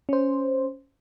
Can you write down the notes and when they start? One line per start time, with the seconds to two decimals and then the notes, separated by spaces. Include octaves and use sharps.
0.09 C#4 C5